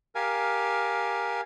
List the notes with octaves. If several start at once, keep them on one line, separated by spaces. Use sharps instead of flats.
G4 A#4 F5 G#5